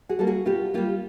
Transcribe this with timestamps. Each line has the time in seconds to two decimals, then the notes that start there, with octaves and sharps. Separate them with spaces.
0.09 F#4 G#4
0.19 G3 A#3 A4
0.27 F#4 G#4
0.45 B2 F4 G4
0.74 G3 A#3 F4 G4